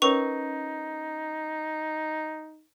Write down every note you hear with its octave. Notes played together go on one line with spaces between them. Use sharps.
C#4 D#4 A#4 B4 C#5 C#6 F7